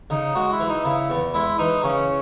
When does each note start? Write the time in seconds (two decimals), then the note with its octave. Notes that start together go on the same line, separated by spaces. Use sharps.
0.10 C#3 D#4
0.35 G#3 F#4
0.52 E4
0.60 E3
0.69 D#4
0.85 C#3 E4
1.10 E2
1.34 G#3 E4
1.58 E3 D#4
1.83 C#3 C#4